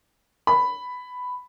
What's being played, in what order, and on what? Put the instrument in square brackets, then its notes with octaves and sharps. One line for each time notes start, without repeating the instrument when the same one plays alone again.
[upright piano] B5